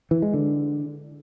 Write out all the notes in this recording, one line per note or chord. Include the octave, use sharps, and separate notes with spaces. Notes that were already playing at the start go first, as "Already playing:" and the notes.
E3
G#3
D3